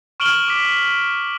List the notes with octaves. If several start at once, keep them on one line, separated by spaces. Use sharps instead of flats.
C#6 F6 D7 E7 F#7 G7
D6 B6